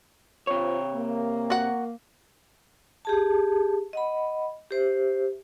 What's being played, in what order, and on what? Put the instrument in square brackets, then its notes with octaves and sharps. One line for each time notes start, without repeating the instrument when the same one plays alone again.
[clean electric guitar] C3 C#5 [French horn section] F4 C5
[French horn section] A#3
[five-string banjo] F#4 F#5
[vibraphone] G4 G#4 A5
D#5 F#5 B5
G4 C5 E5